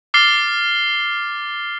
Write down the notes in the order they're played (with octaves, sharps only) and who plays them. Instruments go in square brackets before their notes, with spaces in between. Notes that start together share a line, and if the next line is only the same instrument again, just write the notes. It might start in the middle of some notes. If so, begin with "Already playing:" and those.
[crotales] D6 F6 A6 C7 G7